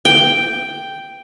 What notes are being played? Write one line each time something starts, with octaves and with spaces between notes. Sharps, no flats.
G5